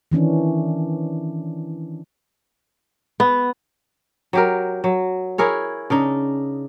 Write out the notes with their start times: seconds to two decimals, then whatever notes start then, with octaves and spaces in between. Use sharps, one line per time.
0.12 D#3 E3 C#4 D4
3.20 B3
4.33 F#3 G4 A#4
4.84 F#3
5.38 E4 G#4 A#4 C#5
5.90 C#3 D4 D#4